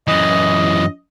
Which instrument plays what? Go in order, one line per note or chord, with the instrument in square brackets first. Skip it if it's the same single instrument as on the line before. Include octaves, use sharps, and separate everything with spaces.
[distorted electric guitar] F#2 E3 [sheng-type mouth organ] D#5